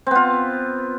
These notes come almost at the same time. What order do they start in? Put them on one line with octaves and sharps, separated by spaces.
C4 B3 F4